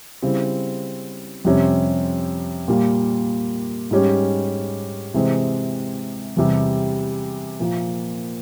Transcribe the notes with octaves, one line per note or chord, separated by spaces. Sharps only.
C#3 G3 C4 E4
F2 C3 G3 C#4
A#2 G3 A#3
G#2 G3 C#4 G4
C3 E3 G#3 C4
E2 C3 G3
A#2 F3 A#3 F4